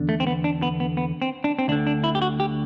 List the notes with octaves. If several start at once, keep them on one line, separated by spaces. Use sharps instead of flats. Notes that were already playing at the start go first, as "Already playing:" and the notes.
Already playing: E2 D3
A3
C4
B3
D4
B3
B3
B3
C4
D4
C4
D2 D3 D4
D4
E4
G4
F#4
G4